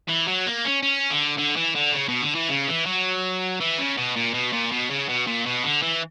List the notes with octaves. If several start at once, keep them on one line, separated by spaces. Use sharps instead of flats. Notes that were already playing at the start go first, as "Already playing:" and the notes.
E3
F#3
A#3
C#4
C#4
D3
D3
E3
D3
C#3
B2
D3
E3
C#3
E3
F#3
E3
C#3
B2
A#2
B2
A#2
B2
C#3
B2
A#2
B2
D3
E3